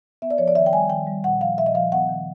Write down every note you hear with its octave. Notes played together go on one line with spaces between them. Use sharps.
B3 E5
D5
F3 C#5
D5
D#3 E5
G5
G3 G#5
D#3 G5
G3
A#2 F#5
F3 F5
A#2 E5
D#5
F3 F5
B3 F#5
D#3